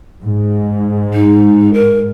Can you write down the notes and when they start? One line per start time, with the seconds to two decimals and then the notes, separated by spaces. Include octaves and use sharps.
0.23 G#2
1.14 D#4
1.74 A#4